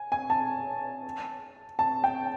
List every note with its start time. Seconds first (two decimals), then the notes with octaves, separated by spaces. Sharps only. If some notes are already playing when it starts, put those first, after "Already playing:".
Already playing: G#5
0.12 G#5
0.30 A5
1.79 A5
2.04 G5